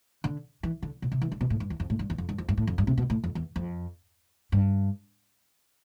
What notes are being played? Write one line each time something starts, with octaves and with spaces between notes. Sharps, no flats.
D3
E3
D3
B2
C3
E3
D3
B2
A2
G2
E2
F2
A2
G2
E2
F2
G2
F2
G2
A2
F2
G2
C3
B2
A2
F2
E2
F2
G2